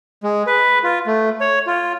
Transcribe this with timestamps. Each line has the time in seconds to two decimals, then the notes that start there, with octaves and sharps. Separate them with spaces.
0.23 G#3
0.47 B4
0.83 F4
1.07 A3
1.41 C#5
1.67 F4